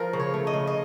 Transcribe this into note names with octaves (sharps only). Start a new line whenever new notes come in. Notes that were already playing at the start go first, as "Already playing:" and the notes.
Already playing: F3 A#4
C#3
C#5
A3
D#5
C#3
D#5